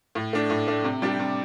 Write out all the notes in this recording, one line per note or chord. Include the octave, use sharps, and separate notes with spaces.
A2
A3 D4
A2
A3 D4
C3
G3 D4 G4
C3